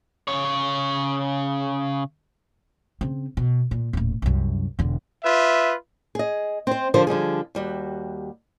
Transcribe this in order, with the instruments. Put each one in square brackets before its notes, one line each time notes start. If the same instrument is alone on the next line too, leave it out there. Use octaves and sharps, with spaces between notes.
[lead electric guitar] C#3 C#5
[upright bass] C#3 C4
B2
A#2
D#1 A2
C2 F#2
E1 D3
[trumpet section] F4 B4 E5
[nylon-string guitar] G#4 D#5
C4 C5
D3 F3 G4 A#4 C5
D3 F3 G3 G#4
D#2 G3 F#4